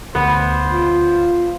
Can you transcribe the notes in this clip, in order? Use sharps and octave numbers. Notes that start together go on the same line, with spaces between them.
D2 B3 C5
F4